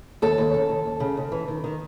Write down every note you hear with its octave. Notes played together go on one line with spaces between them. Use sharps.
D#2 A4
D#2
C#3
D#2
D#2
C#3
D#2
E3
D#3
D#3